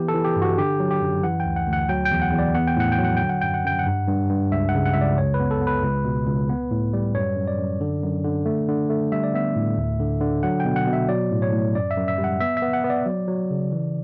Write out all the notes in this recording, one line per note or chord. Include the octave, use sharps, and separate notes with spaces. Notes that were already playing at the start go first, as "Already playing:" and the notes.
Already playing: E3 B3 G4
A4
E3
G4
G2
F#4
D3 G4
F#3
G4
F#2
E3 F#5
G5
D2
F#5
D2
F#5
F#3 G5
G5
E2
F#5
E2
D5
B3 F#5
G5
A2 F#5
G5
F#3
F#5
D3 G5
F#5
F#2 G5
F#5
F#2 G5
F#5
G2
G2
G2
C#2 E5
F#5
C#3
F#5
C#2 E5
D5
F#2 C#5
B4
B3
A4
B3
B4
C#2
B2
C#2
B3
A2
G3
F#2 C#5
F#2
D5
F#2
D3
F#2
D3
A3
D3
A3
G3 E5
D5
B3 E5
A2
D2
D3
D3
F#3 F#5
G5
B2
F#5
B2
E5
F#3 D5
A2
C#5
A2
F#2 D5
E5
F#2
E5
G3
F#5
B3 E5
E5
B3
F#5
B3
D5
F#3
F#3
C#3
E3